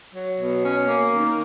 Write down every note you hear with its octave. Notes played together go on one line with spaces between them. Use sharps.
F#3
B2
C#4
A#3
D#3